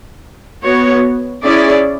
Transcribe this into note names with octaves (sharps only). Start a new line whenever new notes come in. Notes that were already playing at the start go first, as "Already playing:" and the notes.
B3 F#4 C#5
C#4 E4 G#4 D5